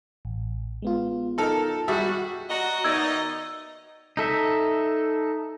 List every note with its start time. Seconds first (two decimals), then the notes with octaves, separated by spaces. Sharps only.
0.25 A1
0.82 G#3 B3 F4
1.38 D#4 A4 A#4
1.88 G3 F#4 G#4 E5
2.50 F#4 D5 D#5 A#5
2.84 D#3 B3 D#4 F#4 D5 E5 E6 G#6
4.17 D#4 A4 E5